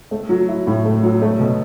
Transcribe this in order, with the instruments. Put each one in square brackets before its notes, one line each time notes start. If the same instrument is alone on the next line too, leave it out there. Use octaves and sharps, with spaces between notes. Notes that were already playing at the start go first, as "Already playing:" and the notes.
[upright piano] A3
F#3
E4
A2
A3
F#3
A3
B2